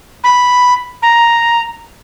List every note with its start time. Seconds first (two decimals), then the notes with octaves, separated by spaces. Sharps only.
0.24 B5
1.02 A#5